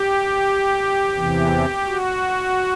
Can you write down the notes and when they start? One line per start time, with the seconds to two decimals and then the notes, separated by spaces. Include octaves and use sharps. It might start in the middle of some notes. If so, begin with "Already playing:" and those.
Already playing: G4
1.14 E2 C3 E3
1.86 F#4